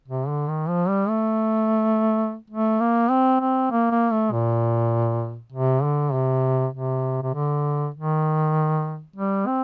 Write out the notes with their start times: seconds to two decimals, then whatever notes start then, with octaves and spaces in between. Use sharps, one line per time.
0.08 C3
0.28 D3
0.48 D#3
0.68 F3
0.88 G3
1.09 A3
2.50 A3
2.80 A#3
3.10 C4
3.41 C4
3.71 A#3
3.91 A#3
4.11 A3
4.32 A#2
5.52 C3
5.83 D3
6.12 C3
6.73 C3
7.22 C3
7.34 D3
7.94 D#3
9.16 G3
9.47 C4